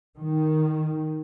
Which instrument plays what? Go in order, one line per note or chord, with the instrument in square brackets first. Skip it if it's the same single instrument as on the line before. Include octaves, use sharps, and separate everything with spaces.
[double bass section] D#3